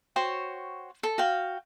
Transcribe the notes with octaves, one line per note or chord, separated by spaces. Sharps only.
F#4 C5 C#5 G5
A4
F#4 F5 G5